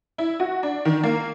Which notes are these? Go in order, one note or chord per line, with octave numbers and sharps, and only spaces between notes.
E4
F#4
D4
D#3
A#3